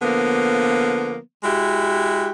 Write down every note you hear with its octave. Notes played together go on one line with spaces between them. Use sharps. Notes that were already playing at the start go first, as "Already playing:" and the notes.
D3 F3 A#3 B3
G#3 E4 F#4 G4